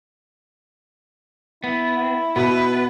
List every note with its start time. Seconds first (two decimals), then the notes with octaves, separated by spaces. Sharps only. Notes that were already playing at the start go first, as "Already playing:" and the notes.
1.64 B3 E4
2.36 B2 B3 B4